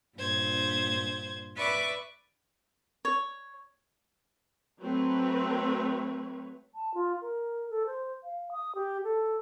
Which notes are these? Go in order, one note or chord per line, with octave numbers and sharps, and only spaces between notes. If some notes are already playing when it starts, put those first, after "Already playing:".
G2 A#2 C5 G#6
B4 D5 E5 C#6 D6
C#5
F#3 A3 C4 B4 C#5
A5
F4
A#4
A4
C5
F5
D#6
G4
A4